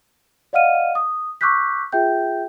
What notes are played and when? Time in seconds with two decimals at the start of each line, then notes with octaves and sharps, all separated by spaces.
0.53 D5 D#5 F5 F#5 F6 D#7
0.95 D#6
1.41 C#6 D6 E6 F#6 G6 B6
1.92 F4 G#4 E5 G5 G6